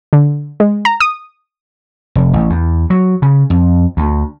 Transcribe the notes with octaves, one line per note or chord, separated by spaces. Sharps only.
D3
G#3
A#5
D#6
F1
A1
E2
F#3
C#3
F2
D2